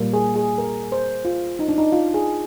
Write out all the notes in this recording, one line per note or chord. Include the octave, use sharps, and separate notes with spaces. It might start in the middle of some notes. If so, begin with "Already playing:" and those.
Already playing: A#2 G3 A#3
G#4
G#4
A#4
C5
F4
D#4
D4
D#4
F4
G#4